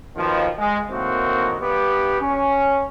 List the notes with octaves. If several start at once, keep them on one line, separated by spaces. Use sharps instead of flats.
D#2 B2 D#3 F3
G#3
A2 D#3 A#3 C4 F#4
G2 B3 G4
C#4